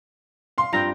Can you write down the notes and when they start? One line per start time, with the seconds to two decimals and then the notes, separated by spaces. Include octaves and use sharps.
0.58 F5 C6
0.73 G2 C4 F4 G5 A#5 A#6